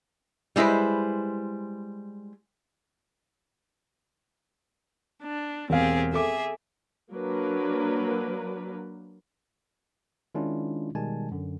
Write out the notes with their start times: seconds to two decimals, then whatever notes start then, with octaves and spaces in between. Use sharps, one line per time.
0.56 G3 G#3 E4 B4 C5
5.21 D4
5.70 E1 C4 G4 G#4 F5
6.13 G#4 A4 E5 D6
7.13 F#3 A#3 D4 A#4 B4
10.35 D#3 G#3 C#4 D4 E4 F4
10.95 B2 D#3 G3 G#3 G#5 A5
11.31 F#2 D3